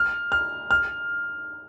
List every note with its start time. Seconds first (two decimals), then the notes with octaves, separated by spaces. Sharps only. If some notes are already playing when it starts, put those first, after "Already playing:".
Already playing: F6
0.32 F6
0.71 F6